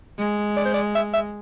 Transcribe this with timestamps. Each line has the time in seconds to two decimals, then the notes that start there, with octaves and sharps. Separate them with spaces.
0.19 G#3
0.57 D5
0.65 C5
0.74 D5
0.95 E5
1.14 E5